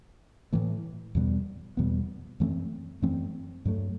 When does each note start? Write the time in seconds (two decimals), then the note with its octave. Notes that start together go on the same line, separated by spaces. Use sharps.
0.53 A2 E3 A3
1.15 E2 B2 G3 B3
1.77 E2 B2 G3 B3
2.40 F#2 E3 A3 C4
3.02 F#2 E3 A3 C4
3.65 G2 F#3 A3